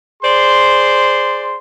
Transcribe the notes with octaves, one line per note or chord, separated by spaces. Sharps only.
G#4 C5 D5 C6